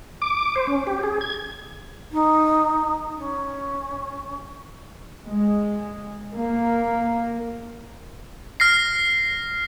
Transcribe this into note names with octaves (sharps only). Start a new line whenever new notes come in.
D6
C5
C#4
G4
G#4
G#6
D#4
C#4
G#3
A#3
F6 A#6 C7